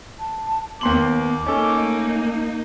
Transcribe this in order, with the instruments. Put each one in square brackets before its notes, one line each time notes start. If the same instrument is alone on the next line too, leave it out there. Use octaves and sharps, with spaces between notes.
[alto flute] A5
[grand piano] D#2 C6 F#7 [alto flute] B3 [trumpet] D6
[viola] A#3 D#4 [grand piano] C#4 A4 [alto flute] D#5
[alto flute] A3